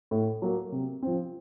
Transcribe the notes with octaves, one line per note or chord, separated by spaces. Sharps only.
A2
F#3 A#3
C3
F3 C4